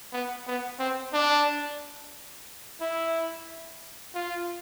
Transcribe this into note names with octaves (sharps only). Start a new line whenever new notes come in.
B3
B3
C4
D4
E4
F4